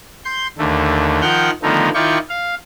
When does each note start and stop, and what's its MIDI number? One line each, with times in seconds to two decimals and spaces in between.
0.25 0.47 84
0.25 0.47 91
0.58 1.21 39
0.58 1.21 50
0.58 1.21 57
1.22 1.50 51
1.22 1.50 53
1.22 1.50 78
1.22 1.50 79
1.22 1.50 89
1.22 1.50 91
1.63 1.89 50
1.63 1.89 51
1.63 1.89 53
1.63 1.89 57
1.63 1.89 59
1.63 1.89 63
1.94 2.18 51
1.94 2.18 64
1.94 2.18 65
1.94 2.18 74
1.94 2.18 79
1.94 2.18 85
2.29 2.55 77